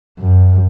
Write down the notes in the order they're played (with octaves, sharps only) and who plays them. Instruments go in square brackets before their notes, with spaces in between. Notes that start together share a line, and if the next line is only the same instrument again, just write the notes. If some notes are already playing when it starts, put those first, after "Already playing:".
[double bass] F#2